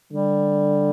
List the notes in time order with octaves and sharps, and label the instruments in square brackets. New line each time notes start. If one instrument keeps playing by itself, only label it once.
[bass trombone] D3 [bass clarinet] G3